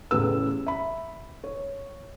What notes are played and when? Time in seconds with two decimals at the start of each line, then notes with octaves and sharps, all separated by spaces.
0.11 E2 A2 C#3 G4 B4 E6
0.67 E5 B5
1.44 C#5